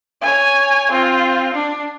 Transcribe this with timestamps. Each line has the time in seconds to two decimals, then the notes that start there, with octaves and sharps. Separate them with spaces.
0.21 C#5 G#5
0.91 C4 F4
1.54 D4